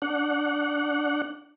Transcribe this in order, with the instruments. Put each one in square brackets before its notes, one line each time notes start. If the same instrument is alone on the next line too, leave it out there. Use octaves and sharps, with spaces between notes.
[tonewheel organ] D4 F#5